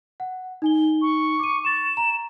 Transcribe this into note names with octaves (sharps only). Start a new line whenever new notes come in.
F#5
D#4 G#5 G7
C#6
D6 C#7 D#7
C#6 A6 E7
A#5